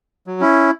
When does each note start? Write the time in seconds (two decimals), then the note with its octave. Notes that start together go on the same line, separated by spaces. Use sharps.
0.27 F#3
0.41 C#4 E4